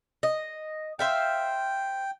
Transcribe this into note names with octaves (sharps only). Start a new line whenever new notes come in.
D#5
C5 E5 F5 G5